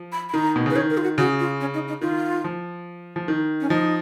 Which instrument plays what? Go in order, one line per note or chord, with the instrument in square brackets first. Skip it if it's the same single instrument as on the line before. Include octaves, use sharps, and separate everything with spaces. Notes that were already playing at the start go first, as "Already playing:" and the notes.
Already playing: [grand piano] F3
[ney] B5
B5
[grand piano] D#3 [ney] A#5
[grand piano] B2
[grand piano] C#3 [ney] B4
[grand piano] D#3 [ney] C#5
[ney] A#4
F4
F#4
[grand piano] C#3 [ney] F#4
[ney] F4
C#4
D#4
D#4
[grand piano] D#3 [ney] F4
[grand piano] F3
F3
D#3
[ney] C#4
[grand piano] F3 [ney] D#4